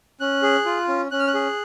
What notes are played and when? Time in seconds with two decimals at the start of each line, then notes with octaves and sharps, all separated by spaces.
0.20 C#4 F#6
0.42 G#4
0.65 F4
0.88 C#4
1.11 C#4 F#6
1.20 F6
1.27 F#6
1.34 G#4